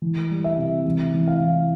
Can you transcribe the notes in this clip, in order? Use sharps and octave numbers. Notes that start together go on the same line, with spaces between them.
E3
G3
E5
C3
E3
E3
F5
E3